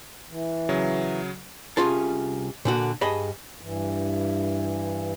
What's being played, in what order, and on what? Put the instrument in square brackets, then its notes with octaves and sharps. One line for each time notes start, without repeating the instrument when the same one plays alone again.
[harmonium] E3
[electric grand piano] C#3 F#3
[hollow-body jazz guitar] C2 G#2 C#4 F4 G#4 A5
A#2 D3 F#4
G2 G#4 D#5 A5 B5
[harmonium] G2 E3